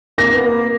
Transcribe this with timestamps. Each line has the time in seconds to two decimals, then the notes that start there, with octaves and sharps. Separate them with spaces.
0.18 A#3 A#6
0.33 B3
0.46 A#3